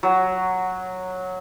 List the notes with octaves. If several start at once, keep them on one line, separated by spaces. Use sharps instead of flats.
F#3